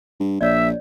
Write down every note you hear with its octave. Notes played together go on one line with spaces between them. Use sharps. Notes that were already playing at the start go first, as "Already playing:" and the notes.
G2
A#1 C#5 D5 E5